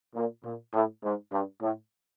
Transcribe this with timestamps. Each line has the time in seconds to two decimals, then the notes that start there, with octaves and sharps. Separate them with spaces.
0.15 A#2
0.43 A#2
0.73 A2
1.03 G#2
1.32 G2
1.61 A2